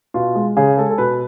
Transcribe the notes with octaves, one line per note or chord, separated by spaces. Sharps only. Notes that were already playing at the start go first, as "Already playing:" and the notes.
B2 F4
G#3
C#3 G#4
G#3 A4
A4
B2 B4